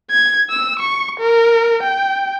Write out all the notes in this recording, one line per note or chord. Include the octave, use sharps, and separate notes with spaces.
G#6
E6
C#6
A#4
G5